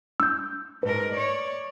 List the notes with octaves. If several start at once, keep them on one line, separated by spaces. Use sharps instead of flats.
E6 G6
G#2 A#4 B4
C#5 D5